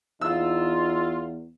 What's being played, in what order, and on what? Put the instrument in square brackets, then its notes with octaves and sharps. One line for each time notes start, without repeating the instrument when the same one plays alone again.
[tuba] E2 [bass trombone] D#4 [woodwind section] F4 [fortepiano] E6